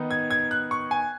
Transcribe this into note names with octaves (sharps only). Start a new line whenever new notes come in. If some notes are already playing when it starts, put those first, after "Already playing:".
Already playing: D#3 B3 D#4
G#6
G#6
F#6
C#6
G#5